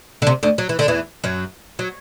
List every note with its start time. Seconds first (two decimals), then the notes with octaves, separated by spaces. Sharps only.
0.22 D3
0.27 C3
0.43 D2 D3
0.58 F#3
0.69 E3
0.79 D3
0.88 E2 E3
1.24 F#2 F#3
1.79 F#3